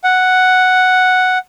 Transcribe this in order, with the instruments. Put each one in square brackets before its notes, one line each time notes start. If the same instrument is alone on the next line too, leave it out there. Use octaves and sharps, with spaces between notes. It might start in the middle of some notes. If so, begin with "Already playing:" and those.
[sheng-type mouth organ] F#5